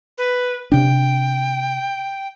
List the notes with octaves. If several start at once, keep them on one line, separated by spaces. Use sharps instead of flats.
B4
C3 D4 G5